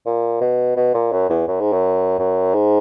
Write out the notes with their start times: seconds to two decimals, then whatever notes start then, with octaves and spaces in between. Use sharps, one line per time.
0.06 A#2
0.40 B2
0.76 B2
0.94 A#2
1.12 F#2
1.30 E2
1.48 F#2
1.60 G#2
1.73 F#2
2.19 F#2
2.54 G#2